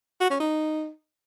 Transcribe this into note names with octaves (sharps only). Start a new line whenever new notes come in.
F#4
C#4
D#4